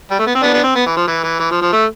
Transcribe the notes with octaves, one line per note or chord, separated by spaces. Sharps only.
G3
A3
B3
C4
B3 D4
B3 D4
C4
B3
E3
F3
E3
E3
E3
F3
F3
A3